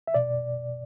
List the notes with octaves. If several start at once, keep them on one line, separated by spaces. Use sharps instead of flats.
E5
B2 D5